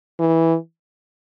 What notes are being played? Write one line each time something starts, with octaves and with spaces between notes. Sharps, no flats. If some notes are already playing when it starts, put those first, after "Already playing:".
E3